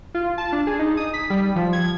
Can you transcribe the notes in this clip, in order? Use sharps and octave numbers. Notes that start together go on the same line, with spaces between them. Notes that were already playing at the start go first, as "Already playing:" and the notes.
F4
A5
D4
G#4
D#4
D#6
B6
G3
F3
G#6